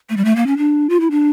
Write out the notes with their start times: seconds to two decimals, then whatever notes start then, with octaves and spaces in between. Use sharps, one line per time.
0.10 A3
0.17 G3
0.25 A3
0.36 A#3
0.47 C#4
0.57 D4
0.89 F4
1.00 E4
1.11 D4